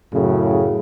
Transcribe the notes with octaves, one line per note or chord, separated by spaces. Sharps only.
F#2 A2 C#3